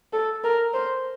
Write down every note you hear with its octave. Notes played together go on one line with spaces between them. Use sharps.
A4
A#4
C5